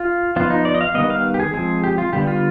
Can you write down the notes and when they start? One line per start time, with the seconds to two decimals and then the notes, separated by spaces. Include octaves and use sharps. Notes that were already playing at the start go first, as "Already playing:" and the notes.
Already playing: F4
0.36 F3 B3 F4
0.50 D#4
0.65 D5
0.75 D#5
0.81 F5
0.95 D#3 G3 B3 D#5
1.10 F5
1.34 G4
1.40 G#4
1.54 F3 G#3 C4 G#4
1.84 G4
1.98 F4
2.13 D3 G3 B3 G4
2.27 F4